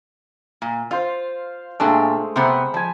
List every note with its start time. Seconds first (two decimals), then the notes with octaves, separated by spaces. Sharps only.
0.62 A#2
0.91 F4 C5 F5
1.80 A#2 G#3 A3 D4 G4
2.36 C3 B3 C5 A#5 B5
2.74 F3 G#5 A5